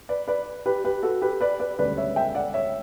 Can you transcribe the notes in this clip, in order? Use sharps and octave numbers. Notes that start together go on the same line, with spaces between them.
B4 D5
B4 D5
G4 B4
G4 B4
F#4 A4
G4 B4
B4 D5
B4 D5
E1 D2 C#3 G3 B4 D5
C#5 E5
E5 G5
D5 F#5
C#5 E5